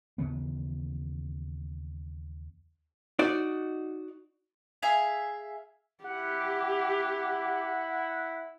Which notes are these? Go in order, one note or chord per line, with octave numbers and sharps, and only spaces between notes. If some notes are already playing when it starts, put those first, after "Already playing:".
D#2 C#3 E3 B3
D#4 F#4 D5
G#4 E5 F5
E4 G4 F#5